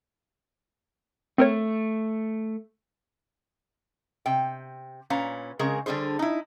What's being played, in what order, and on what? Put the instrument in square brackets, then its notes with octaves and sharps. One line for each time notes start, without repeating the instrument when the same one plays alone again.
[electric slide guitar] A3 [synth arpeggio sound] C4 A#4 C#5
[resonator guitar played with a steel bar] C3 G5
A#2 C#4 B4 F5 A#5
C#3 G#3 C4 G#4 A#4
D3 G3 D4 G#4 C5
D#4 E4